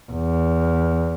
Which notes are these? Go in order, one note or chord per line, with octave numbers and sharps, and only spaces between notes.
E2